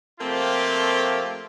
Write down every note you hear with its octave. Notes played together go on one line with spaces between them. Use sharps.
F3 A3 A#3 C4 F4 G4